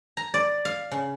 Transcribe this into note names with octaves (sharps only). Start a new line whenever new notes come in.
A#5
D5
F5
C#3